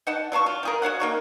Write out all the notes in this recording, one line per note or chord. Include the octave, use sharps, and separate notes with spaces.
D#4 F#5 A5
F#3 F5 A5 C#6
F4
F3 G#4 A#4
F#4 C#5 F5 F#5
A#3 D#4 C#6